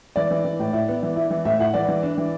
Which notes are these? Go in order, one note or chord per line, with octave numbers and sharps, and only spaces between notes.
E3 D5
E3
E3
A2
E4
B3
E3
E4
E3
A2 E5
E4 F#5
E3 D5
E3
D4
E3